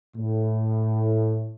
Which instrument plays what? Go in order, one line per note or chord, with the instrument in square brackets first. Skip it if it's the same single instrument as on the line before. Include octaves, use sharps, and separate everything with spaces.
[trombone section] A2